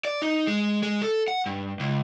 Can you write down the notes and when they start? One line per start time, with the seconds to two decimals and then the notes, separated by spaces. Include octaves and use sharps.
0.05 D5
0.22 D#4
0.47 G#3
0.83 G#3
1.02 A4
1.28 F#5
1.46 G2
1.80 C#2